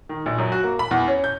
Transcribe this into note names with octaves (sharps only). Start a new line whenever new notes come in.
D#3
A#1
F#2
F#4
A#3
B5
E2
C#4
G6